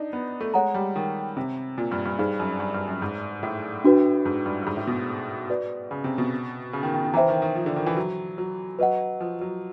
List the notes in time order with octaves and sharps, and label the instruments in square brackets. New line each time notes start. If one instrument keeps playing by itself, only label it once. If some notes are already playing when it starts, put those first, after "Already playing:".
Already playing: [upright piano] D4 D#4
B3
A3
[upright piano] G#3 [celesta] C#5 F#5 A#5
[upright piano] G3
D#3
C3
A#2
G2
G2
[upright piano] G2 [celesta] D#4 G#4 C5 F5
[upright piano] F#2
G2
G2
F#2
G#2
A2
[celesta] D4 F#4 B4
[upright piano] G#2
G2
G2
G#2
A2
B2
[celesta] F#4 B4 D5
[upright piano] C#3
C3
B2
C#3
D#3
D#3
D#3
[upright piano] E3 [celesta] C5 E5 G5 A#5
[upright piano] D#3
D#3
F3
D3
D#3
E3
F#3
F#3
[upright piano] F#3 [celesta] B4 D#5 F#5
[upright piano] F3
F#3